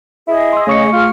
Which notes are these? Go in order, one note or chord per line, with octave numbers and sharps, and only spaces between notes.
E4 G#4 D#5
C6 E6
C#3 A3 C#6 C#7
F4 G#4 F6